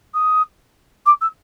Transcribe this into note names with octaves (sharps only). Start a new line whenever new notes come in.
D#6
D6
E6